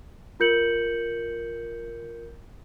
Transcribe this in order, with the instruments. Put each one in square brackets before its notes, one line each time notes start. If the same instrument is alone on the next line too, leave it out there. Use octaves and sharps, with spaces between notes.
[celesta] F4 A#4 G6 C#7 F#7